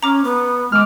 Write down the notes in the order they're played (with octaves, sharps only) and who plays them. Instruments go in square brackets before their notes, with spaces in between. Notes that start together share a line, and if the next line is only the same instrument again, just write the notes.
[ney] C#4 [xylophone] A#5 D6 F6
[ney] B3
[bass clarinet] G#3 [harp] D6 F6